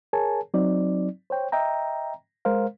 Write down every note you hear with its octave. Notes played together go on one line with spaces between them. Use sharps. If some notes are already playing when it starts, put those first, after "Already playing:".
G#4 A#4 C#5 G#5 A5
F#3 C4 D#4 D5
C5 C#5 G5
D#5 E5 G5 A#5
G#3 A#4 C5 F5